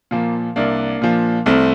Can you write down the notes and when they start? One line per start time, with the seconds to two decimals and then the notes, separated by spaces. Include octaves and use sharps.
0.11 A#2 F3 A#3
0.56 C2 A#3 D4
1.02 A#2 F3
1.46 C2 A3 C4